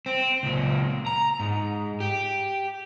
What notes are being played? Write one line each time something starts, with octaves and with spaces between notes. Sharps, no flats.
C4
C#2 A#2
A#5
G#2
G4